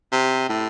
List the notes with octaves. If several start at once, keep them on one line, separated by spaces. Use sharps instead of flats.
C3
A2